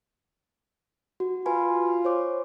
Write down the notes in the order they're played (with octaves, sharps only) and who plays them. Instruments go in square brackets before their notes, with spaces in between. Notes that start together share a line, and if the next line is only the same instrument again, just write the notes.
[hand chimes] F#4
[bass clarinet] F4 [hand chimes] B4 G#5 B5
[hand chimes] C5 C#5 D6